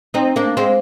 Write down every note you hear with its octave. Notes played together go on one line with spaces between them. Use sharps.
C4 D#4
A#3 D4
G#3 C4